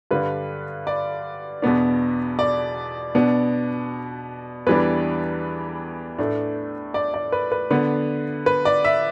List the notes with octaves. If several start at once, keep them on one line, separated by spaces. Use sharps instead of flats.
G2 D3 G3 D4 B4
D5
E2 B2 B3 D4
D5
B2 B3 D4
E2 E3 G3 D4 B4
A2 A3 D4
D5
D5
B4
B4
D3 B3 D4 B4
B4
D5
E5